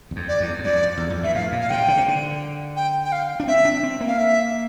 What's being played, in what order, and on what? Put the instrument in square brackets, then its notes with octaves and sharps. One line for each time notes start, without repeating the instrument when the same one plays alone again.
[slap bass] E2
F2
[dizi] D5
[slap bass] E2
E2
[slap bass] F2 [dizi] D5
[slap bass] E2
F2
[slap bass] G2 [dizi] E5
[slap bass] A2 [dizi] F5
[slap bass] A#2
[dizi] F5
[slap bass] C3 [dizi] G5
[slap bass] D3
C3
D3
[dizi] G5
G5
F5
[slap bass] D4
[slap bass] C4 [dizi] E5
[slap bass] D4
C4
A#3
[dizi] F5
E5